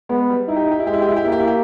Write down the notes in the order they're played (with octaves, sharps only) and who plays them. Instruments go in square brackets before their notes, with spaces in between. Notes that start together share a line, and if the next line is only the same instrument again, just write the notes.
[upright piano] G#3 [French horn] B3
[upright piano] G3
[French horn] D#4 [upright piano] E4
[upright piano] G4
E4
G4
E4
[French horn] G#3 [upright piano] G4
[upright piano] E4
G4
E4
G4
[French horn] A#3 [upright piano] E4
[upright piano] G4
E4
G4